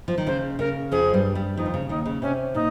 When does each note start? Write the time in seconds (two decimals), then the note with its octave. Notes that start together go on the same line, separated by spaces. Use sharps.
0.08 F3
0.18 D#3
0.27 C#3 C5
0.59 C#3 A#4
0.91 F2 F3 G#4
1.13 G2 G3
1.35 G2 G3
1.57 F2 F3 D#4
1.66 D#3
1.74 C#3
1.89 D#2 D#3 D#4
2.06 C#3
2.22 C3 C#4
2.55 A#2 D#4